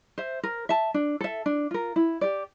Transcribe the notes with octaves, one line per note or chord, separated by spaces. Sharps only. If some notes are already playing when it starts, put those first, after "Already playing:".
C5 E5
A#4
E5 A5
D4
A4 E5
D4
F4 A#4
E4
G4 D5